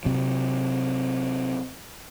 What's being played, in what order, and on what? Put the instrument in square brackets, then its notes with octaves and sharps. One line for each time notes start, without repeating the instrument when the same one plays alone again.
[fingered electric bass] C3 F#3